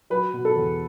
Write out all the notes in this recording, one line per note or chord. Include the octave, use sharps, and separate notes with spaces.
F#3 B4
B2
A4
E2